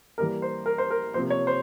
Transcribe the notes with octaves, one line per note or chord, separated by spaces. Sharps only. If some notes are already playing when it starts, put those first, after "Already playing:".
E3 G3 A#3 A#4
C5
A#4
C5
A#4
C3 F3 A#3 C5
C#5
C5